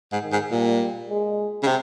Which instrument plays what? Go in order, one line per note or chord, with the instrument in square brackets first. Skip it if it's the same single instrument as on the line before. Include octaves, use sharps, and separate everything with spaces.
[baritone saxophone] G#2
[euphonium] D#3
[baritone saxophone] G#2
[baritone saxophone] A#2 [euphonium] G3
[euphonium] G#3
[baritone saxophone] C#3
C3